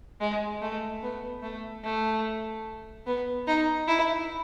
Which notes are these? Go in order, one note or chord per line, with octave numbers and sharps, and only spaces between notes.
G#3
A3
B3
A3
A3
B3
D#4
E4